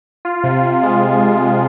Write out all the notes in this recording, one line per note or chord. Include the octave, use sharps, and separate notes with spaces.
F4
C3
C3
G#3
F4
F4
G#3